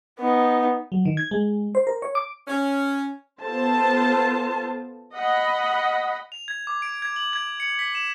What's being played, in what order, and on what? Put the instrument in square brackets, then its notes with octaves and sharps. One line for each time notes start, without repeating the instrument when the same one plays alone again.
[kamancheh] B3 D#4
[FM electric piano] F#3
D#3
G#6
G#3
C5
A#4
C#5
D6
[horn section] C#4
[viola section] B3 F4 A4 C5 A5
D#5 F#5 B5
[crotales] F7
G#6
D6
D7
G#6
F#7
G#6
C#7
B6
E7